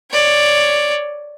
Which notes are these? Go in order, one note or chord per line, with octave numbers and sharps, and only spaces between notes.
C#5 D5